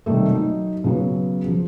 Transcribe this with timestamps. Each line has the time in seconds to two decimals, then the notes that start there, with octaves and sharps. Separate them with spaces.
0.06 C3 D#3 G3 A3
0.30 F#3 D#4
0.84 C#3 F#3 B3
1.47 F3